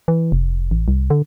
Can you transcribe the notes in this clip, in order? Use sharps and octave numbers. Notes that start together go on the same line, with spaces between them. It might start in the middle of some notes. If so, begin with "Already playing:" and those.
E3
F1
A1
C2
D3